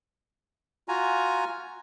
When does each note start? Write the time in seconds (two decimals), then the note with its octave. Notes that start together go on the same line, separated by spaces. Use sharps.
0.88 F4 F#4 G#5 A#5